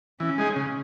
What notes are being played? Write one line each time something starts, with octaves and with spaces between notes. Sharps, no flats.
E3 C#4
G#3 D#4 G#4
C#3